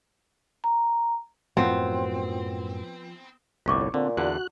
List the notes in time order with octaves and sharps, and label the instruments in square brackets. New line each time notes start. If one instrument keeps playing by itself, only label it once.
[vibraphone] A#5
[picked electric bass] F#2 A2 F#3 [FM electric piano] F3 [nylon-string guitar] B3 [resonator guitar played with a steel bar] C4
[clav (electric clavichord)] G1 C2 A2 [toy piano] F4 C#6 D6
[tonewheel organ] C#5
[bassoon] A#2 [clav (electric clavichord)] D3 [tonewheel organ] C4
[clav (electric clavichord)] E2 D3 [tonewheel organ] F#4 F#6